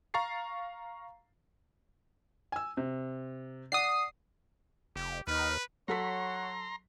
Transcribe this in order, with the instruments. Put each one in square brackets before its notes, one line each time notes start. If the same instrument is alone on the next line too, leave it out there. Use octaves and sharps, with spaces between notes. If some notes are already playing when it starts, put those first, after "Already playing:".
[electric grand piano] F5 A#5 C#6 A6 C7
[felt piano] G#5 E6
C3
[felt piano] D5 F#5 [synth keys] D#6 C7
[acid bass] F1 [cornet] G4
[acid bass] D#2 [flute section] D#4 F6 [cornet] B4
[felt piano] F#3 A4 B6 [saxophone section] C#5 F#5 [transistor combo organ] A#5 C6